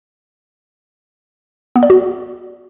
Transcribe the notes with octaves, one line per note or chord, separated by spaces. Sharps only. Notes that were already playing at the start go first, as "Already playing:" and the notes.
B3
D5
F#4